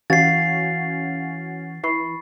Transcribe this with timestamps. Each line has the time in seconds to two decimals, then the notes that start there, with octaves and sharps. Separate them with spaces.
0.10 E3 C#4 F#4 F5 F#5 G#6 A6 C7
1.83 E3 B5 C#6 C7